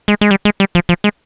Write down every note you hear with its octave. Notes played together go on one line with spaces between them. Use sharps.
G#3
G#3
G3
G#3
G3
F3
F3
G#3